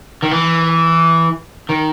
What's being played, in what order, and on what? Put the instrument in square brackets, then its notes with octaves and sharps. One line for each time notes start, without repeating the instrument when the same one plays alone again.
[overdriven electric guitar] D#3
E3
D#3